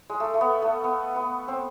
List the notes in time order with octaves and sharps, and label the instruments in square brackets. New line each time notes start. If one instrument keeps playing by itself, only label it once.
[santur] G#3
A3
A3
B3
A3
B3
B3
C4